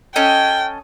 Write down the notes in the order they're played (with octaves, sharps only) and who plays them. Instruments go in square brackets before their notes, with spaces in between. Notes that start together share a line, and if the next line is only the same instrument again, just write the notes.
[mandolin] C#4 A4 D#5 [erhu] G5